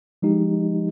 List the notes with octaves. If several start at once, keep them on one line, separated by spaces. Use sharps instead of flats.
F3 G#3 D#4 G4